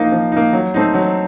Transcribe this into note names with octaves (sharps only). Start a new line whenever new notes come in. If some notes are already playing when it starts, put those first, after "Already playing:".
Already playing: F3 A#3 D#4
F3
A#3 D#4
F#3
A3 C4 D#4
F#3